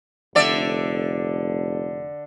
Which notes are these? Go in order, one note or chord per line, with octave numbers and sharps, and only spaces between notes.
F1 D3 D5 E5